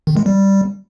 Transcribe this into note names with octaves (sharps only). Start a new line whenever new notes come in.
D#3
G#3
G3